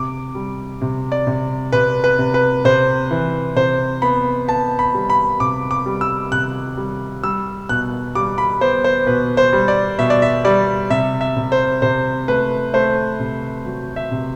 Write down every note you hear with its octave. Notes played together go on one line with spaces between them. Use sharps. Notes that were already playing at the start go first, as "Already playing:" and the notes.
Already playing: C3 D6
G3
C3
D5
C3
C3 B4
B4
C3
B4
C3 C5
E3
C3 C5
B3 B5
B3 A5
B5
G3
B5
C3 D6
D6
G3
E6
C3 F#6
G3
G3 E6
B2 F#6
G3 D6
B5
B3 C5
C5
B2 B4
C5
G3
D5
B2 E5
D5
E5
G3 D5
C3 E5
E5
C3
C5
C3 C5
A3 B4
A3 C5
C3
F#3
E5
C3